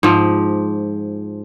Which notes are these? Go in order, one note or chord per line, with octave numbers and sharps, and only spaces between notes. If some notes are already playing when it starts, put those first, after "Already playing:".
G#2 F3